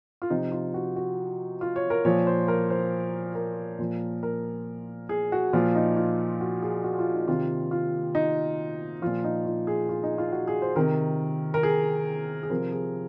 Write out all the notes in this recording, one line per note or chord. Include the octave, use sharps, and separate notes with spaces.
F4
C3 F3 D#4
F4
F#4
F#4
F4
C#5
A#4
A#2 F3 C#5
C5
A#4
C5
A#4
A#2 F3
A#4
G#4
F#4
A#2 F3 F4
D#4
F4
F#4
G#4
F#4
F4
D#4
C3 D#3 F4
F4
D#4
A#2 F3 F4
D#4
F4
G#4
F4
D#4
F4
F#4
G#4
C5
C3 D#3 A#4
A#4
G#4
G#4
C3 F3 A#4
G#4